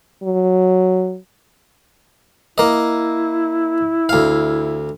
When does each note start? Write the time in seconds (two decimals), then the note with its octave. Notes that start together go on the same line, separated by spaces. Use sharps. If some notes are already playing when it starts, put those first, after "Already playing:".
0.23 F#3
2.58 A#3 E4 D#5
4.09 D2 F5